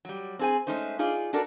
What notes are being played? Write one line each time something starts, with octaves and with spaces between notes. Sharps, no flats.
F#3 G3
C4 D4 G#4 C5 G#5
G#3 A3 C#4 D#4 C5
D#4 F4 G#4 D5
D4 F#4 A4 A#4 D5